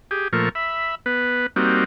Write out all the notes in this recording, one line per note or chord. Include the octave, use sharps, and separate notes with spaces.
G4 G#4
A#2 F3 A3 A#4 C#6
E5 B5
B3 B4
G3 A#3 C4 D#4 F#4